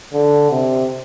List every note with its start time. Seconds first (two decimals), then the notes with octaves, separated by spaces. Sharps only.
0.13 D3
0.51 C3